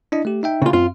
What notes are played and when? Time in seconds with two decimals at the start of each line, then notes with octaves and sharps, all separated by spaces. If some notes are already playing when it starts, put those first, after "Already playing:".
0.12 D4 E4 D#5
0.25 A3 G4
0.43 D#4 E5 G5
0.62 C#3 F4
0.73 F#2 C4 F4